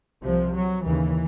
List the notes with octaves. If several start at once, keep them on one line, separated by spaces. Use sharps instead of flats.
C2 C3 F3
F#3
D#2 C#3 E3